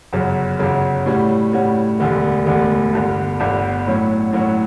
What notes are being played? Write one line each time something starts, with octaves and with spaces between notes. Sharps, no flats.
G1 F#2 C#3 F#3
G1 F#2 C#3 F#3
A2 G3 C#4 F#4
A2 G3 C#4 F#4
E1 D2 D3 G3
E1 D2 D3 G3
G1 G2 D3
G1 G2 D3
A2 F#3 C#4 F#4
A2 F#3 C#4 F#4